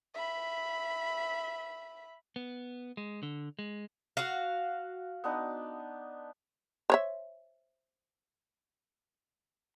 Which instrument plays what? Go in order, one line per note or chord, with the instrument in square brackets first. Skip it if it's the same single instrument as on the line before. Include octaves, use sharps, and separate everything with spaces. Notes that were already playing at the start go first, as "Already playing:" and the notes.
[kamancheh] E5 B5
[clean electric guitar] B3
G#3
D3
G#3
[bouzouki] F#4 F5
[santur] B3 D4 D#4
[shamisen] C5 C#5 E5